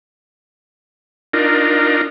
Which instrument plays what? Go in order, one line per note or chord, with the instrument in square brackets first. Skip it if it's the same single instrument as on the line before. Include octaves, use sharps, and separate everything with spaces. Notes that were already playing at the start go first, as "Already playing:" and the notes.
[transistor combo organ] D4 D#4 F4 A#4